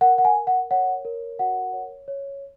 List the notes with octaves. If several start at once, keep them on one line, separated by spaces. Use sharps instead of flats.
A#4 F#5
F#5
G#5
A#4
F#5
C#5 F#5
A#4
F#4 F#5
C#5
C#5